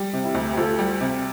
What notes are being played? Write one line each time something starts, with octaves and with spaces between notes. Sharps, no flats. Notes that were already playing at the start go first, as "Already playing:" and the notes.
Already playing: G3
C3
E4 G4
D2
G4
D2 F4 A4
G3
C3